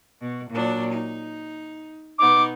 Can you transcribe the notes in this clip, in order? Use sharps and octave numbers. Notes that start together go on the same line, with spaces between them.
B2
A#2 F#3 D4
D#4
B2 B3 D#4 D6